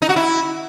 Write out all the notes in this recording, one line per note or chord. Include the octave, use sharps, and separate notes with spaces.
D#4
F#4
E4